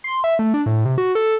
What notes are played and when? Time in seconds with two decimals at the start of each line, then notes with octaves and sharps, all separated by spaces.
0.04 C6
0.24 E5
0.39 A3
0.54 D4
0.66 A2
0.85 C3
0.98 F#4
1.15 A4